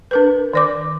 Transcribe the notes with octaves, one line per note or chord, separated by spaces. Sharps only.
D4 A#4 B4
D#3 D5 D6